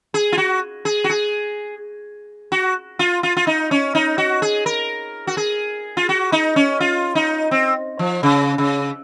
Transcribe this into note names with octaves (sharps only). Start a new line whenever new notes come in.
G#4
F4
F#4
G#4
F#4
G#4
F#4
F4
F4
F4
D#4
C#4
D#4
F#4
G#4
A#4
F#4
G#4
F4
F#4
D#4
C#4
F4
D#4
C4
F3
C#3
C#3